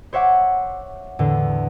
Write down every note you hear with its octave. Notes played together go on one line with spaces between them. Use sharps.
C5 C#5 E5 F#5 D6
E2 A2 D3